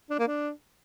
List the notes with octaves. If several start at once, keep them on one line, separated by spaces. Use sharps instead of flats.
D4
A#3
D4